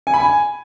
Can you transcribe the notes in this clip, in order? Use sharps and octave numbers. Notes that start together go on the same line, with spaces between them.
G#5
B5
G#5